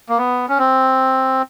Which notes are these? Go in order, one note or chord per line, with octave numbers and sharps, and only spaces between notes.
A#3
B3
C#4
C4